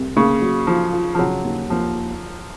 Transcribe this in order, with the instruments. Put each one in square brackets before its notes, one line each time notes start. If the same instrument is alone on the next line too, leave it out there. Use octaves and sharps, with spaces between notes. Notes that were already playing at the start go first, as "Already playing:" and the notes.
Already playing: [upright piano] C2
[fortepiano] C#3 [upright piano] A#3
[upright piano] F#3
[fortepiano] F3 [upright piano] F4
[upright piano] F4
[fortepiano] F3
[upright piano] C#3 [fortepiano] F#3
[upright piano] D#2
[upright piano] D#2 [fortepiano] F3